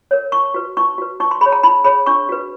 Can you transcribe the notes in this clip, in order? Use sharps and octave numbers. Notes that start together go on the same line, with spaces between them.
A#4 C#5
D#4 C#6
F#4 B4
D#4 C#6
F#4 B4
D#4 C#6
C6
G#4 B5
C#5
A#5
D#4 B5
G#4 C#5 B5
D4 C#6
F#4 B4